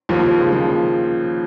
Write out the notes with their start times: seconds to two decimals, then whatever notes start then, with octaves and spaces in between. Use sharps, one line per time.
0.09 D#2 F3
0.23 D#2
0.38 C#3
0.52 F3